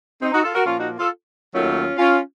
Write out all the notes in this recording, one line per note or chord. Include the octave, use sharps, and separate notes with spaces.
C4 D#4
D#4 F#4
F4 A4
F#4 A#4
A#2 F3 A#3 C#4 F4
D#4 F#4
F4 A4
D#2 D#3 F#3 A3 C#4 F4
C#4 F4